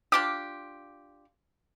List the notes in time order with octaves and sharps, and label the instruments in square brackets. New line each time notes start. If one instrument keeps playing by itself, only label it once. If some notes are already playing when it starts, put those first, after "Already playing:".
[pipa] D4 F4 G4 [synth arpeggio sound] D6